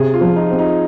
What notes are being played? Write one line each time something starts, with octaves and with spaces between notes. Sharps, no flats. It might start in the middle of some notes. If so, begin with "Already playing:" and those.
Already playing: C3 G#4
F4
F3
D#4
C4
D#4